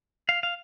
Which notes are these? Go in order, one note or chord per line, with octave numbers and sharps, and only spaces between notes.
F5
F5